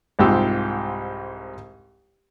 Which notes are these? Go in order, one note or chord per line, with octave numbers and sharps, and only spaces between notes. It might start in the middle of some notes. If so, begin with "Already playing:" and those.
C2 G#2 F4 G4 E6